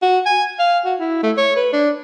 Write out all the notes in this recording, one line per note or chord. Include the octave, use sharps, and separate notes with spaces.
F#4
G#5
F5
F#4
E4
A3
C#5
B4
D4